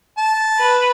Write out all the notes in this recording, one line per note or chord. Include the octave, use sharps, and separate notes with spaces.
A5
B4